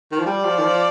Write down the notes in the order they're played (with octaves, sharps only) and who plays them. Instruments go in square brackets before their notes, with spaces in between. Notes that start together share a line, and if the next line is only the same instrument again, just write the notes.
[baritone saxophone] D#3
F3
[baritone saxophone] G3 [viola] D5
[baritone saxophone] F3
D#3
F3